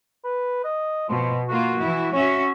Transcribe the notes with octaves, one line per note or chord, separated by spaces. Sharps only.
B4
D#5
B2 F3
A#3 F4 F#4
E3 E4
C#4 F#4 C#5 E5